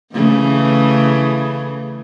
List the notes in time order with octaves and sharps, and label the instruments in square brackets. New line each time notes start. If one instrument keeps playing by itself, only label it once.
[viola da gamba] C#3 E3 A3